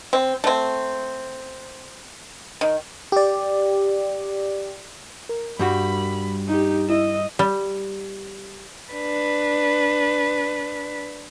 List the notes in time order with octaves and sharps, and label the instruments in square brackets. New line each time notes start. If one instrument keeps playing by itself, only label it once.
[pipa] C4
A3 C4
D#3
[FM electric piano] G4 D5
[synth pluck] A#4
[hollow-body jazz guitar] G2 G3 F#4 [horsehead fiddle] B5
[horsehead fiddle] D#4 G4
[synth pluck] E4 E6 [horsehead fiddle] D#5
[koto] G3
[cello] D4 B4